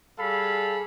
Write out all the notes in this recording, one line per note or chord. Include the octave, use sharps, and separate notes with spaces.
G3 G#4 A4 F5 B5